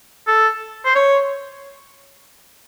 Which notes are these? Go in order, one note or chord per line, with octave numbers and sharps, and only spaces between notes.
A4
C5
C#5